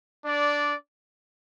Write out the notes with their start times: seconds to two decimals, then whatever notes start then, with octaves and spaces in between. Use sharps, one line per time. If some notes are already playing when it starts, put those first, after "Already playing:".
0.24 D4 D5